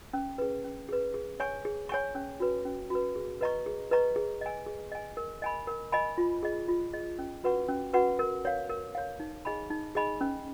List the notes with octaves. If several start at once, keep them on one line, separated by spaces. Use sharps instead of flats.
C#4
G#4 B4
C#4
G#4 B4
G#4
C#5 G#5 C#6
G#4
C#5 G#5 C#6
C#4
F#4 B4
C#4
F#4 B4
G#4
B4 D#5 A#5 C#6
G#4
B4 D#5 A#5 C#6
G#4
D#5 G#5
G#4
D#5 G#5
A#4
D#5 G#5 B5
A#4
D#5 G#5 B5
F4
G#4 D#5
F4
G#4 D#5
C#4
F#4 B4 F#5 C#6
C#4
F#4 B4 F#5 C#6
A#4
C#5 F5
A#4
C#5 F5
D#4
G#4 D#5 G#5 B5
D#4
G#4 D#5 G#5 B5
C#4